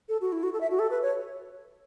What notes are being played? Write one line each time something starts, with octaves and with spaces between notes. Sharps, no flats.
A4
F#4
E4
F#4
A4
E5
F#4
A4
B4
C#5